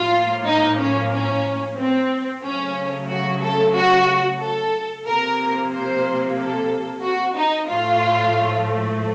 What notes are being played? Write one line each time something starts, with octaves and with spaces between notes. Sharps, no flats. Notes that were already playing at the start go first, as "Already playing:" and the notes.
Already playing: A2 F3 A#3 F4
D#4
C#4
C#4
C4
C#3 F#3 A3 C#4
F#4
A4
F#4
A4
C3 F3 A#3 A#4
C5
A4
F#4
D#4
A2 F3 A3 F4